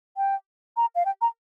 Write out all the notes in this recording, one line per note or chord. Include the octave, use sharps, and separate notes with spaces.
G5
A#5
F5
G5
A#5